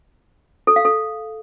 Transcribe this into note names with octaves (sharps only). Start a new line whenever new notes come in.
A4
F5
A4